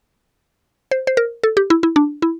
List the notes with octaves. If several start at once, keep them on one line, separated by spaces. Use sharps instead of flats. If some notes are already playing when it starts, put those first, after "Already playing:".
C5
C5
A#4
A4
G4
E4
E4
D4
E4